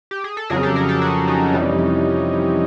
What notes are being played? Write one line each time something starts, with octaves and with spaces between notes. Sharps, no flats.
G4
G#4
A4
F2 C#3 F#3 G#4 A#4
G4 A4
G#4 A#4
G4 A4
F#4 G#4
C#4 D#4
F2 C3 E3 G3